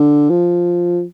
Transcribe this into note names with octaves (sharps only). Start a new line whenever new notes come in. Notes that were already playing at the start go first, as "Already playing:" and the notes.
Already playing: D3
F3